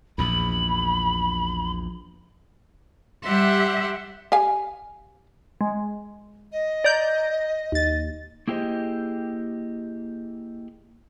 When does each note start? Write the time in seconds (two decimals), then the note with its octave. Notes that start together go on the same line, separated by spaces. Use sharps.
0.18 A#1 E2 B5
3.25 G3 G4 E5 F#5 C6
4.32 G4 F5 G#5
5.61 G#3
6.51 D#5
6.84 D5 A#5 G6
7.72 D#2 A6
8.48 A#3 E4 G4 G#4 C5 D#5